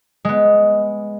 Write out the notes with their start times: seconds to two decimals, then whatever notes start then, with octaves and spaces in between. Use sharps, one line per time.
0.25 G#3 B3